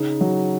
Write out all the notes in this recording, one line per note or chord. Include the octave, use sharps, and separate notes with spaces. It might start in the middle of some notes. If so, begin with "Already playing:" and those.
Already playing: C#3 D#4
F#3